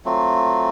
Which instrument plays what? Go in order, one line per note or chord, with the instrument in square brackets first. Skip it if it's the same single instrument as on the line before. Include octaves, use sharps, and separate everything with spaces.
[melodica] F#3 A3 C4 F4